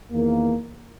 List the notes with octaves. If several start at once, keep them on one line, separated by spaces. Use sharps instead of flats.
E2 D#3 A#3